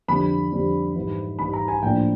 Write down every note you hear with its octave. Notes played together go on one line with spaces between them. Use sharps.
F2 D3 G3 B5
F2 D3 G3
G#2 E3 G3
G#2 E3 G3 B5
A#5
G#5
A2 F3 A#3 D4 G5